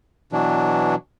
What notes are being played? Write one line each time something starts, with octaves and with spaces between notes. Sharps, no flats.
B2 E3 F#3 D4